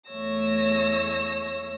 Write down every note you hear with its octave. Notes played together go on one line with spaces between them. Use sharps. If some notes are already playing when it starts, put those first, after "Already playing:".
E2 A3 C#5 E6 A#6